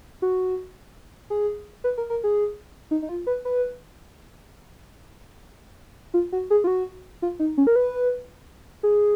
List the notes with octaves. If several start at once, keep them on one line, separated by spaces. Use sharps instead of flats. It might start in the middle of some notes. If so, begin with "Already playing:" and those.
F#4
G#4
B4
A#4
A#4
G#4
D#4
D#4
F4
B4
B4
F4
F#4
G#4
F4
F#4
F4
D#4
C#4
A#4
B4
G#4